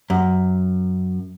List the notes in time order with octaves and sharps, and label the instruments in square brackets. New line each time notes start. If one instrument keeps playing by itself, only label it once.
[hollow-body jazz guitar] F#2